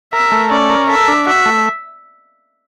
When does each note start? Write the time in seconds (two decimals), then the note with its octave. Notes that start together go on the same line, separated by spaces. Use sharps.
0.13 A#4 E5
0.32 A3
0.51 C#4 D5
0.70 A#4
0.89 A4 E5
1.08 D4
1.27 F#4 E5
1.46 A3